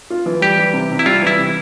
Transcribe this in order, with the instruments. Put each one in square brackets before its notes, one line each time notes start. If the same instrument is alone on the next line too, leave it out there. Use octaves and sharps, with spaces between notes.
[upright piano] F4
E3
[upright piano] G3 [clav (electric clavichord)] G4
[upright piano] E3
C3
C3
[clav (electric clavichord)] E4
[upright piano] G3 [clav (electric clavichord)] F4
[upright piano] E3 [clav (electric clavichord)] E4
[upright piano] C3